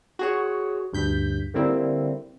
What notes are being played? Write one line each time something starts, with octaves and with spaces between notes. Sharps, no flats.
F#4 G#4 C#5
D2 G2 G6 B6
D3 G3 A#3 C4 E4